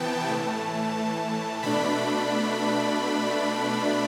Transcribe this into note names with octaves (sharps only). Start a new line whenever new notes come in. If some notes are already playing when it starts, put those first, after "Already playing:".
Already playing: C3 E3 B3 G5 A5
A2 E3 A3 A5
B2 A3 D4 B5